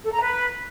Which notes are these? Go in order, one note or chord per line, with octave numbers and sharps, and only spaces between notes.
A4
A#5
B4